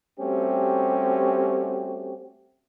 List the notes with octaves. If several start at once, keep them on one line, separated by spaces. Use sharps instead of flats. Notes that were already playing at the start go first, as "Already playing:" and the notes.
G3 A3 C4 C#4 F#4 G4